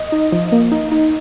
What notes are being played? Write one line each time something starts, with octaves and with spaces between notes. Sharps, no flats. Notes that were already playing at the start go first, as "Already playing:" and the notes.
Already playing: D#5
D#4
F3
A#3
D#4
D#4